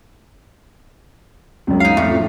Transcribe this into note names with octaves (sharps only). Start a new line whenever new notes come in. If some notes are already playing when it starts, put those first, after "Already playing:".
C#2 F#2
D#4 F5
F2 A2 E5
F3